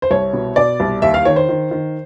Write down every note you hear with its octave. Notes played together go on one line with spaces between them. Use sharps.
C5
C2 C#5
B2
B2 D5
C2
D#2 E5
F5
D#3 C#5
C5
D#3
D#3